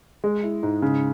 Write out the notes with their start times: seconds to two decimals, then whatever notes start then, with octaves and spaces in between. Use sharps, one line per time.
0.24 G#3
0.43 E4
0.63 G#2
0.82 C#3